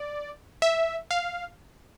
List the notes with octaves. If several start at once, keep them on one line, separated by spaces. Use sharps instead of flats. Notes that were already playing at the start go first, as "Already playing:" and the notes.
Already playing: D5
E5
F5